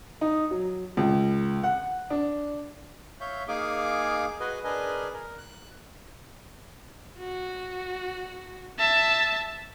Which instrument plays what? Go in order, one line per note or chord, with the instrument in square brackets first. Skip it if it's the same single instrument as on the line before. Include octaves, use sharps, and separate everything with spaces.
[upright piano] D#4
F#3
C#2
F#5
D4
[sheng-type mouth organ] C#5 E5 F5 C#6 G6
A#3 D#4 G#4 F5 G#5 D6
F#4 G#4 B4 D#5 G#5
D4 G#4 A#4 B4 D#5 G#5
A#4
F#6
[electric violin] F#4
E5 A5